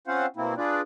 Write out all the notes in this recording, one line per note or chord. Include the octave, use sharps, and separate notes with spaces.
C4 C#4 F4 C5 F5 F#5
B2 A#3 C4 E4
D4 F4 G#4 B4 D5